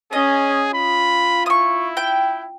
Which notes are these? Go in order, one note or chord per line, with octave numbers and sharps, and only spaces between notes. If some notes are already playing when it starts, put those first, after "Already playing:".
C#4 G#4 D#5
F4 B5
E4 C#6 D#6
G5